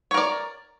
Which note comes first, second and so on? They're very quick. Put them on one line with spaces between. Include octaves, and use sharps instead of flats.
C#5 A#4 D5